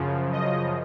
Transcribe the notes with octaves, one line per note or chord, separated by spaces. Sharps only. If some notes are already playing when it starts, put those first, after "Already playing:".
Already playing: F#2 C#3 F3
D#5